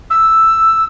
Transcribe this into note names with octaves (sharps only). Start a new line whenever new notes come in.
E6